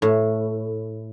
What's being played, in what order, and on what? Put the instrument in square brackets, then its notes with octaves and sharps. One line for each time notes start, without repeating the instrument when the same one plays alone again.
[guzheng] A2